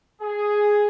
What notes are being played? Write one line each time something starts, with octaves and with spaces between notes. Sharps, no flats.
G#4